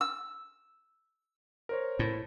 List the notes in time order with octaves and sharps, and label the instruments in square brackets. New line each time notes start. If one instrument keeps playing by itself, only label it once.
[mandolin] E6
[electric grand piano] A#4 C5 C#5
[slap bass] A2